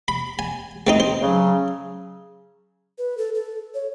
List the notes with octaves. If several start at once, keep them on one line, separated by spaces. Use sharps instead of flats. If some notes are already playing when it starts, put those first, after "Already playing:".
B5
G#5
A3 C4 D#4
C5
C#3 F#3
B4
A4
A4
C#5